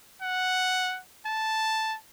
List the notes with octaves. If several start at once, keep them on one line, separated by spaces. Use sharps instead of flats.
F#5
A5